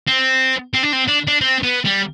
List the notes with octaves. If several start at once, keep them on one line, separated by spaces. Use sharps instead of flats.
C4
C4
D4
C4
D4
D4
C4
B3
G3